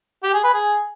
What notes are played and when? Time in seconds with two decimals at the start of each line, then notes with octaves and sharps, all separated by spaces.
0.23 G4
0.34 G#4
0.44 B4
0.54 G#4